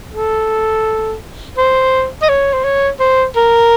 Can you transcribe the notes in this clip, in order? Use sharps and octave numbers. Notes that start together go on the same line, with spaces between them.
A4
C5
D#5
C#5
C5
C#5
C5
A#4